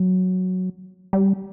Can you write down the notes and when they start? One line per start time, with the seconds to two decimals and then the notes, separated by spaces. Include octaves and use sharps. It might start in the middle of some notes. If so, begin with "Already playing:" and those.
Already playing: F#3
1.13 G3